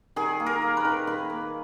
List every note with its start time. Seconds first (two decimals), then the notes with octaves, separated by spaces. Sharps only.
0.16 D#3 G#4
0.40 A#3
0.46 A#4
0.62 A#3
0.77 B4
0.85 D#3
1.07 D#3 B4
1.30 A#3